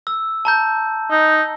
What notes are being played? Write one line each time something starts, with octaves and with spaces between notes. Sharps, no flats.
E6
A5 A#5 G6
D#4